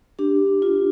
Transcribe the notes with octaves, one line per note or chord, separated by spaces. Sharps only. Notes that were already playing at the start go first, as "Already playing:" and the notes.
D4 G4
F4